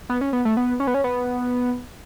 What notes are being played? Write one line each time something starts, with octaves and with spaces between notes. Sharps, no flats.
B3
C#4
B3
A3
B3
C#4
B3
C#4
B3